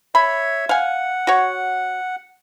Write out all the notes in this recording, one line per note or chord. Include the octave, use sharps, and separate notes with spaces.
C#5 E5 B5
F5 F#5 G#5
F#4 C#5